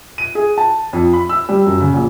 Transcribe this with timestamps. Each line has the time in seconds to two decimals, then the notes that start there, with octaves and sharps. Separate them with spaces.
0.18 D#7
0.35 G#4
0.58 A5
0.93 F2
1.13 B5
1.29 E6
1.49 G3
1.66 F#2
1.80 C#3
1.94 A#1